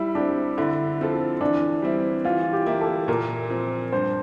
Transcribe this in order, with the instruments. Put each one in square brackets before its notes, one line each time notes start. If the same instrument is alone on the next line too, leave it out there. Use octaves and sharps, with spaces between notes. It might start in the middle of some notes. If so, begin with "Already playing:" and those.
Already playing: [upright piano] G3 [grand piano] E4
[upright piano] C4 G4 [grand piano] D4
[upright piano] D3 [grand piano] E4
[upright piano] F3 C4 F4 A4
[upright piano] E3 [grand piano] D4
[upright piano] G3 C4 E4
[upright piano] E3 [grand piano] F4
[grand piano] G4
[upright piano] A#3 E4
[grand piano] A4
[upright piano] A#2 [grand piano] A#4
[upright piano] F3 C4
[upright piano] G2 [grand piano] C5